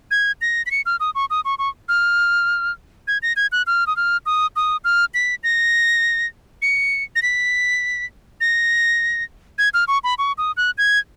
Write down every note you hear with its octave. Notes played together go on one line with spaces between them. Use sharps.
G#6
A#6
B6
C#7
F6
D#6
C#6
D#6
C#6
C#6
F6
G#6
A#6
G#6
F#6
F6
D#6
F6
D#6
D#6
F6
B6
A#6
C#7
A#6
B6
A#6
G#6
F6
C#6
B5
C#6
D#6
F#6
G#6